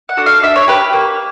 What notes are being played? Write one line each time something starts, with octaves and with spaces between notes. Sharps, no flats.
F#5
D4 F#4 A4
F5
D4 E5
C#5
G4 B4
A#3